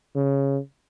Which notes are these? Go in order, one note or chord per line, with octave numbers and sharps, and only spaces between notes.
C#3